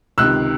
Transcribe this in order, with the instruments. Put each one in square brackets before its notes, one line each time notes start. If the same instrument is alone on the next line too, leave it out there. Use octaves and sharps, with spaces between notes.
[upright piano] C#2 C3 D#3 E6 F#6